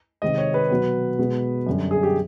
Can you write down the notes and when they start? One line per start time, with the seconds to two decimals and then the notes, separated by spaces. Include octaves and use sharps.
0.22 C3 D#3 G#3 C4 D#5
0.38 C#5
0.54 B4
0.70 B2 F#3 B3
1.18 B2 G#3 B3
1.67 F#2 D3 G3
1.91 G#4
2.03 G4